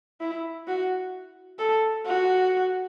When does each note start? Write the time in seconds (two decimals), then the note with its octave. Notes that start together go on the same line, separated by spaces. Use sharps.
0.21 E4
0.68 F#4
1.59 A4
2.05 F#4